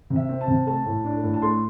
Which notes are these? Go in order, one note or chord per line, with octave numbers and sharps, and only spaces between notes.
C3
E5
C4
A5
C3
A3 A5
A2
D4
A2
A5
A3 C6